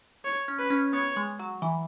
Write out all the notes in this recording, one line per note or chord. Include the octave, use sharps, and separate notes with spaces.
C#5
C#4
B4
C#4
B3 C#5
G#3
F#3
E3